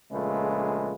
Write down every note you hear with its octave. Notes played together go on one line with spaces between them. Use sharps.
A#1 C#3 G#3 A3 F4 B4